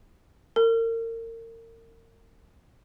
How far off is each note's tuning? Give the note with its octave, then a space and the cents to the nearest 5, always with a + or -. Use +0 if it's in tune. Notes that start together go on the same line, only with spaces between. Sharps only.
A#4 -35